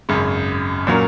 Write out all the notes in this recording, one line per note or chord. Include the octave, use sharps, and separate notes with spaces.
G#1 F#2 C#3
A#2 F#3 A#3 C#4